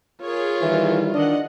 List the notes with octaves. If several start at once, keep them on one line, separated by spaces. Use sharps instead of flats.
F4 G#4 A#4 C#5
D#3 E3 G3 E4
D#3 D4 D#5 F#5